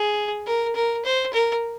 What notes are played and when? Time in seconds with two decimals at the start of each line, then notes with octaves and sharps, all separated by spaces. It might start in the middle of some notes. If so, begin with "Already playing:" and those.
Already playing: G#4
0.46 A#4
0.75 A#4
1.05 C5
1.33 A#4